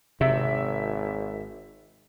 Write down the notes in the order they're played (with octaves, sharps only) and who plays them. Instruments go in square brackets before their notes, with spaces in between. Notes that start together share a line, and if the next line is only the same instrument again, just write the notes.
[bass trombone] G#1 [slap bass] C3 [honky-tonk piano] E5